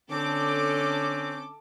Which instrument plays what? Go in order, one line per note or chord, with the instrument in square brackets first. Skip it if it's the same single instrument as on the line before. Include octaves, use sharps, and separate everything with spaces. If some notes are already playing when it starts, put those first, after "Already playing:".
[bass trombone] D3 [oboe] C4 [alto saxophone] C#4 [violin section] A4 D6